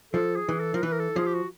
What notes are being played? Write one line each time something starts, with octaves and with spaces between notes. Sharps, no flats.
F3 A4
G#4
E3
A4
F3 A#4
E3 B4
A#4
A4
F3 G#4
G4
F#4